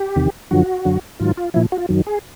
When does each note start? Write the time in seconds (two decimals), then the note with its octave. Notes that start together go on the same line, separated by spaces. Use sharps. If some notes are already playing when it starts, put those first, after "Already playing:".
Already playing: G4
0.16 E2 C3 D#3
0.51 F#2 D3 F3 F#4
0.85 F#2 D3 F#3
1.19 G#2 D#3 F#3 F4
1.37 F4
1.54 A#2 F3 E4
1.72 F#4
1.78 F4
1.89 F#2 D#3 F#3
2.07 G#4